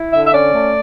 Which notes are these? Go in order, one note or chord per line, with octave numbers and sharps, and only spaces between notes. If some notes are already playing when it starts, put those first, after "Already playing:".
Already playing: E4
D3 E5
E5
C#4 D5
A3